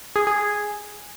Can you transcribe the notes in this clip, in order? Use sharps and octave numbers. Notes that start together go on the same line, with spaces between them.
G#4
G#4
G#4